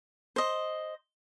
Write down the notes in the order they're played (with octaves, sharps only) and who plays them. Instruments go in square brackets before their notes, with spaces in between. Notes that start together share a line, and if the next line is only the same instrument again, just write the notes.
[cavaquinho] C5 D#5